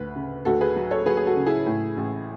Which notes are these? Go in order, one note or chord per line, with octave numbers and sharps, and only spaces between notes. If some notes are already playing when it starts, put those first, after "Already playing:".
Already playing: D2 B4
C#3
D2 F#4 A4
G#4 B4
F#3
A4 C#5
F#3 G#4 B4
G#4
F#4 A4
C#3
E4 G#4
A2
A1